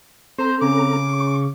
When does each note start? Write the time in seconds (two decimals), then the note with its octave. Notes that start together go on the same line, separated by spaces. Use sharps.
0.38 C4 A4 C5 A#5
0.62 C#3 D6
1.09 C#6